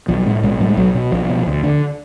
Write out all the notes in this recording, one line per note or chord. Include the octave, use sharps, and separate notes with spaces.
B1 F3
F#3
A2 G#3
B1 G#3
A2 F#3
G#3
B1 F#3
B2
B1 F3
B2
D2
D3